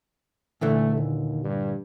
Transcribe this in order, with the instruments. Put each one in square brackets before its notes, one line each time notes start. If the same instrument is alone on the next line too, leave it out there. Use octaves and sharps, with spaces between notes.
[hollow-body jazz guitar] A#2 D3 E3 [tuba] A3
[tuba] D#2
G2